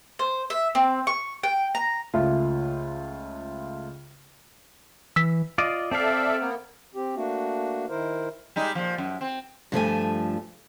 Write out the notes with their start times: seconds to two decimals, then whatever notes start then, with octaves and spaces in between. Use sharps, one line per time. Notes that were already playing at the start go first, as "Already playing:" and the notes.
0.19 C5
0.50 E5
0.75 C4
1.07 C#6
1.43 G5
1.75 A#5
2.14 C#2 A3 F4
5.16 E3 E6 B6
5.58 F4 D5 D#5
5.91 C4 A4 D5 E5 F5
6.41 A#3 B3
6.95 C4 G4
7.16 A3 A#3 D4 F#4
7.89 D#3 E4 A#4 C5
8.56 G3 G#3 D#4
8.75 A#2 F3
8.98 F#2
9.21 C4
9.72 G2 F3 A3 G#5